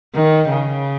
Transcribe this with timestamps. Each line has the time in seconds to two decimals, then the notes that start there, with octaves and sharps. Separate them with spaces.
0.15 D#3
0.49 C#3